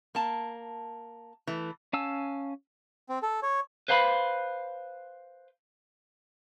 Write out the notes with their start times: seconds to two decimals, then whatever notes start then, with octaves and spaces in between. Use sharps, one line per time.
0.15 A#3 A5
1.47 E3 A3
1.93 C#4 F5 G#5 A5 E6
3.09 C4
3.23 A4
3.43 C#5
3.88 B4 C5 F5 A#5 B5